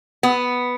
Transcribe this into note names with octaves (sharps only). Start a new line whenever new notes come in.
B3